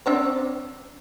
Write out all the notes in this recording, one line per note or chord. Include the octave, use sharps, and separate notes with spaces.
C4 D4 C#5